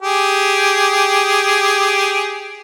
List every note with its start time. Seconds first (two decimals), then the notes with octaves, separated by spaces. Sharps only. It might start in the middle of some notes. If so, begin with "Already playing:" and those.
0.02 G4 G#4